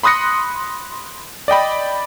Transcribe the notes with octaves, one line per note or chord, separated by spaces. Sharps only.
B5 C6 D#6 F#6 A#6 C#7
D5 D#5 G5 B5